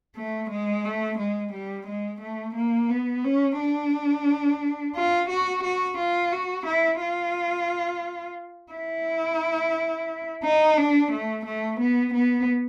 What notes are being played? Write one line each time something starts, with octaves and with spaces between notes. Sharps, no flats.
A3
G#3
A3
G#3
G3
G#3
A3
A#3
B3
C#4
D4
F4
F#4
F#4
F4
F#4
E4
F4
E4
D#4
D4
A3
A3
B3
B3